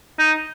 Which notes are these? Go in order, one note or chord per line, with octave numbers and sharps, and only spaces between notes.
D#4